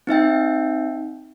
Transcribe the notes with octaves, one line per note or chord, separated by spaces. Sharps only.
C4 D#4 E5 G5